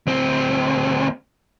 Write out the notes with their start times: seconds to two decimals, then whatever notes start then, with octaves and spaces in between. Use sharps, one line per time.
0.07 D2 C4